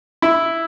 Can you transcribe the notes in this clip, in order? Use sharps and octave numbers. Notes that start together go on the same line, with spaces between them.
E4